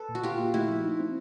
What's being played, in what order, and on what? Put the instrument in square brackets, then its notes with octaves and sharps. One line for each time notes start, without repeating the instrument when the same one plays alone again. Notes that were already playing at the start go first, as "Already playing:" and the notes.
Already playing: [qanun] A4 B4
[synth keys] A#2
[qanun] F#4
[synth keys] A#2 [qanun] F4 G4
[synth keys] A#3
[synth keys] A3 [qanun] E4 F#4
[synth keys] F3
D#4
C4